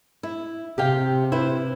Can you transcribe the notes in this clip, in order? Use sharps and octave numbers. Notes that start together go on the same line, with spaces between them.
E4
C3 G4 F5 G5
E4 B4 C5